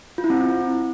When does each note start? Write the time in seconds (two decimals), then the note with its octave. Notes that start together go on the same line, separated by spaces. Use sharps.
0.18 F4
0.24 E4
0.30 C4